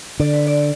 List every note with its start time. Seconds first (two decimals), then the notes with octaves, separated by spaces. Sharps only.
0.19 D3 D5
0.33 B4
0.47 D5